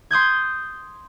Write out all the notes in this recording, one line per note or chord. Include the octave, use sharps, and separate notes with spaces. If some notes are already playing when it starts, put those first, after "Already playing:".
C6 D#6 G6 G#6